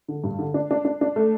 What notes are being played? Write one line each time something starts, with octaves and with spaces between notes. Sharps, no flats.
D3
G2
D3
D4
D4
D4
D4
A3